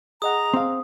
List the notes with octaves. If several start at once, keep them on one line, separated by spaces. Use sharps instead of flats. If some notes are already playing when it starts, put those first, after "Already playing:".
G#4 D#5 F#5 A#5 D#6
C4 F5